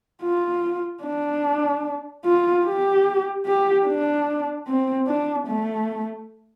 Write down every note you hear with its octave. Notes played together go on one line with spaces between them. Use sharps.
F4
D4
F4
G4
G4
D4
C4
D4
A3